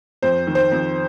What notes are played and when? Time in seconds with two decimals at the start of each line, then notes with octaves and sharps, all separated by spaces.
0.22 F2 C5
0.47 D#3
0.55 C5
0.72 F2